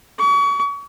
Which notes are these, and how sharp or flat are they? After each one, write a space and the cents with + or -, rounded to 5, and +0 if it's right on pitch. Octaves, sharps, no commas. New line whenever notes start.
C#6 +35